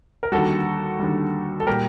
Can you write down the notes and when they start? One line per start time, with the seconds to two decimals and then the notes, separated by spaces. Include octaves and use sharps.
0.23 A#4
0.32 D#2 D3 G3 F#4 A4
0.99 D#2 D3 G3
1.60 A4
1.67 A#2 G3 G4 A#4